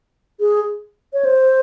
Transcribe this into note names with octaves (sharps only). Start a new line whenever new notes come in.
G#4
C#5
C5